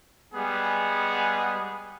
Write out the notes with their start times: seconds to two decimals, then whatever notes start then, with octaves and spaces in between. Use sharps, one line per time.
0.34 G3 G#3 B3 G#4 F#5